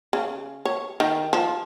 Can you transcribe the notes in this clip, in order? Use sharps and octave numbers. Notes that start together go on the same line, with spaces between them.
C#3
C#5
D#3
F3